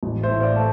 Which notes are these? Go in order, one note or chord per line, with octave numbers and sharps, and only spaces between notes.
A1
C5 E5
A2
D5 F5
A3